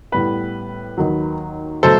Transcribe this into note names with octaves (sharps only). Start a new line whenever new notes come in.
A2 G3 B3 B4
D#2 D#3 F#3
B2 F#3 A3 A4 C5